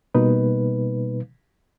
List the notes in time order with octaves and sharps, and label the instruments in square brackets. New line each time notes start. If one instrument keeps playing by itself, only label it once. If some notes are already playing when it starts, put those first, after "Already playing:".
[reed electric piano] B2 G3 A#3 D#4 B4